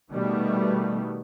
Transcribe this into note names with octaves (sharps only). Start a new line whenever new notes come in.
B2 D#3 G3 A3 B3